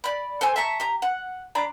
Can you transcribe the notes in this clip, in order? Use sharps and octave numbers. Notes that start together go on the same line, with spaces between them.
D5 B5
A4 C5 G5 G#5
E5 A5 A#5 C#6
G4 A#5
F#5
D4 D5 A#5 B5